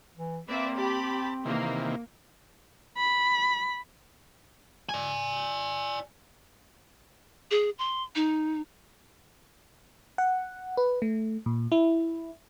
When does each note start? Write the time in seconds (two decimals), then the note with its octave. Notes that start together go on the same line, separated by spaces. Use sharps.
0.17 E3
0.48 A#3 C4 B4 D5 E5
0.78 G4 A5 B5
1.45 C3 D#3 E3 A#3
2.98 B5
4.89 D5 G#5
7.51 G#4
7.79 C6
8.15 D#4
10.18 F#5
10.77 B4
11.02 A3
11.46 A#2
11.72 E4